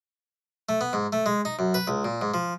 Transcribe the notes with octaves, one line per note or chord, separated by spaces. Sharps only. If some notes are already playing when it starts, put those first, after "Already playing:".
A3
B3
G#2
A3
G#3
D#4
F#2
B4
C#2
A#2
G#2
F3